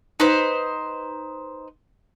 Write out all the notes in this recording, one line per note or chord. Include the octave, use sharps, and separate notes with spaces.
D#4 B4 C5